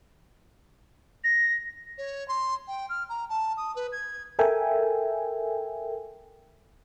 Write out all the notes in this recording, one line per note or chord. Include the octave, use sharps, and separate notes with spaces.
A#6
C#5
C6
G5
F6
A#5
A5
D#6
B4
G#6
A4 A#4 E5 G5 G#5